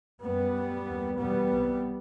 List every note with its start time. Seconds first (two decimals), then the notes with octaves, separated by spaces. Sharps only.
0.24 F#2 G3 B3
0.57 F#2
0.88 D#2
1.21 E2 B2 G3 B3
1.53 C2 C3